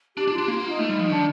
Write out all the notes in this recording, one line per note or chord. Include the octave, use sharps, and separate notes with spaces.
D4 G4
D4
F4
D4
A#3 F4
F4
D#4
A3
G3
F3
D#3 D4